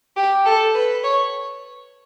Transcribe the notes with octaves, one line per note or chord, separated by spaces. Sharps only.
G4
A4
B4
C#5